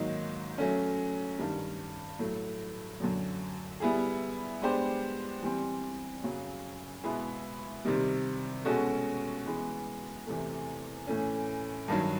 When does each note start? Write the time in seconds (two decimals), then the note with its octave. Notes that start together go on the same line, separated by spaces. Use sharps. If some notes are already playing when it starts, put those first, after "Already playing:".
Already playing: G#2 D#3 F#3 A#3 D#4
0.58 F#3 A3 C#4
1.39 G2 D#3 G3
2.19 A2 F#3 A3
3.00 F#2 D3 F#3
3.80 G3 B3 E4 G#4
4.62 G#3 B3 D4 G4 C5
5.42 E3 G3 C4
6.24 F#2 C#3 F#3
7.04 B2 G#3 B3 E4 G#4
7.85 C3 D#3 G3
8.65 B2 G#3 C#4 F#4 A4
9.46 E3 G#3 B3
10.27 E2 C3 E3 A3
11.07 A2 E3 A3 C#4
11.88 G2 D#3 F#3